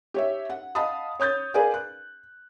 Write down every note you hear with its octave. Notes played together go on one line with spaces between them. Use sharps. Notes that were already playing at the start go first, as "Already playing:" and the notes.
G4 C#5 E5
F#5
D#5 F5 F#5 A5 B5 D#6
C#5 D#6 G6 A6
G#4 A#4 B4 D5 F5 G#5
F#6